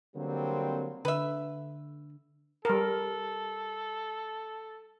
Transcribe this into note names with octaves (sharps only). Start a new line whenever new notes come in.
D3 F#3 G3 A#3 C4
D3 B4 E5
G3 A4 A#4